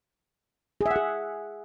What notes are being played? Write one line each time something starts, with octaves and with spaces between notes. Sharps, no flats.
G#4
E5
F#5
G#4